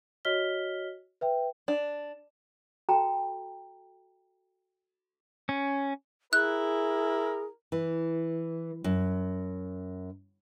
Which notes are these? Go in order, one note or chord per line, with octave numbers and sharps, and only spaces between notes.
F#4 C#5 D#5 F6 B6 G7
B4 E5 G5
D4
F#4 A4 G5 A5 A#5
C#4
E4 G#4 A#4 F#6
E3
F#2